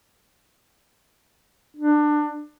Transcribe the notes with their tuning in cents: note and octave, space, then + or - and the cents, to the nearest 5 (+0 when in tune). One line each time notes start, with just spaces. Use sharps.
D4 +20